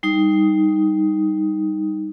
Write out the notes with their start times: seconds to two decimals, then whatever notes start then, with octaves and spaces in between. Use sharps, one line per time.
0.03 G3 D#4 D#6